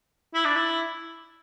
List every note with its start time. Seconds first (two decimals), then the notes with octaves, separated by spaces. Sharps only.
0.34 E4
0.45 D4
0.56 E4